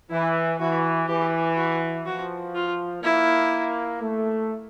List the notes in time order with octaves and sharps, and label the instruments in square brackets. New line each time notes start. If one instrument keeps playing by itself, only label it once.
[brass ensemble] E3 [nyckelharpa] E4
[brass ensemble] E3 [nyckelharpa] F#4
[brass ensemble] E3 [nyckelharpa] G4
[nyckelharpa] F#4
[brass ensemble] F3 [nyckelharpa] F#4
[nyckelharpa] F4
[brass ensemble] A#3 [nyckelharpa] E4
[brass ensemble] A3